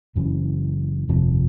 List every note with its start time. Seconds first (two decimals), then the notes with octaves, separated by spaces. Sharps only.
0.16 F#1 F#2 C#3 E3
1.09 G1 F2 C3 F3